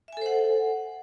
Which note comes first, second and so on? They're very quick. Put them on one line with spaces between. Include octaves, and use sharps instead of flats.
E5 G#5 A4 C5 F#5